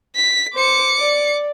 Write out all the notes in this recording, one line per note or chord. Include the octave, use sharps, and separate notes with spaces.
B6
C5 D6 C#7
D5